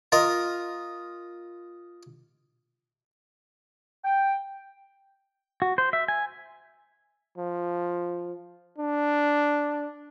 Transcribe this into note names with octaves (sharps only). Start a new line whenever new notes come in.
F4 A#4 D#5
G5
F#4
C5
E5
G#5
F3
D4